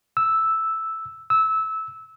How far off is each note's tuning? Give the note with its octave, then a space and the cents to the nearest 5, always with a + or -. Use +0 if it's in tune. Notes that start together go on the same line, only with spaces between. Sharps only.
E6 -5
E6 -20